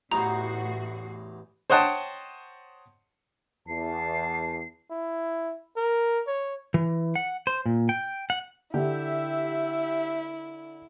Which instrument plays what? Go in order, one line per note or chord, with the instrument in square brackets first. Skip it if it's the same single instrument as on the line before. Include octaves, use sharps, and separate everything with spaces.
[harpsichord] A1 E2 D#4 [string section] A2 F#4 C7 [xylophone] A#5
[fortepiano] C5 C#5 D#5 F#5 G5 A5
[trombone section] E2 [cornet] A5 [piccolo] C7
[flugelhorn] E4
A#4
C#5
[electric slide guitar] E3
F#5
C5
A#2
G5
F#5
[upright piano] D3 [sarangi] E4 [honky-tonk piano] G4 [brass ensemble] E5